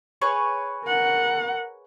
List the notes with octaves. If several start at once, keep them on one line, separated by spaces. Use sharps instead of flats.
G#4 B4 C#5
A#4 F#5